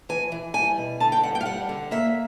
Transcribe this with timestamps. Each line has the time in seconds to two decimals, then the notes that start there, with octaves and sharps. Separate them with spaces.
0.09 E3 G#5
0.32 E3
0.54 G3 G#5
0.77 B2
1.00 D3 A5
1.12 G5
1.23 G2 F#5
1.35 G5
1.41 F5
1.45 G3 F#5
1.69 D3
1.91 A#3 E5